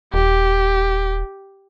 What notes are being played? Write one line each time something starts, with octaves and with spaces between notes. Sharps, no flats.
D#1 G4